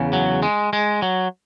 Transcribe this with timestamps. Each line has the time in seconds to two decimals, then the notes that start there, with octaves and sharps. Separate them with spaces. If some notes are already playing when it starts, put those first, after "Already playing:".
Already playing: E2 C#3
0.13 F#3
0.42 G#3
0.73 G#3
1.02 F#3